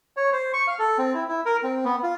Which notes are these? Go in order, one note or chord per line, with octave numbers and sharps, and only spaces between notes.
C#5
C5
C#6
F5
A4
C4
E4
E4
A#4
C4
B3
F4